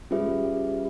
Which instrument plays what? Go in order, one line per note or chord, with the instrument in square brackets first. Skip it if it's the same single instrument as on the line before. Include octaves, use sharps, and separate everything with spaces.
[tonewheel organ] G3 [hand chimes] C#4 F4 G#4 B4 E5
[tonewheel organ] G#3
G3